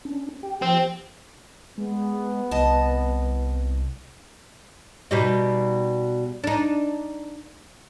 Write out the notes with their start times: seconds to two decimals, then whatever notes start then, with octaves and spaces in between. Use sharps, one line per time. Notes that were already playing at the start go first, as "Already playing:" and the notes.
0.05 C#4 D4
0.43 G4 G5
0.62 F3 C4
1.78 G#3 B3
2.51 C2 D#5 A5
5.11 B2 G3 D#4
6.44 D4 D#4